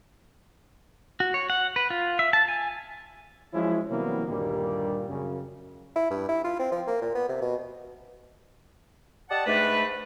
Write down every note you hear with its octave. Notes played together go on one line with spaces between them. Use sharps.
F#4
C#5
F#5
B4
F4
E5
A5
G#5
F3 F#3 G#3 C#4 E4
C3 E3 F#3 G3 A#3 B3
D2 G2 A#2 D#3 G3 A#3
F#2 C#3
E4
G2
E4
F4
C4
F3
A#3
A#2
B3
C3
B2
G4 D5 D#5 F#5 A5
G#2 A3 D4 B4